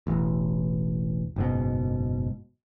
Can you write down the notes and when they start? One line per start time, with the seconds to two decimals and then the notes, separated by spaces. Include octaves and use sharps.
0.07 E1 A1
1.36 F#1 G#2 B2